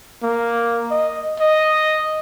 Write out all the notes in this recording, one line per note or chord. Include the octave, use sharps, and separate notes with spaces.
A#3
D#5
D#5